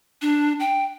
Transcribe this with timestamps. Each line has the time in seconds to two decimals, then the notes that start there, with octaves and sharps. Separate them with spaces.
0.22 D4
0.60 G5